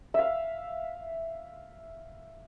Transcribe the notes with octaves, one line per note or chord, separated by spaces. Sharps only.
E5 F5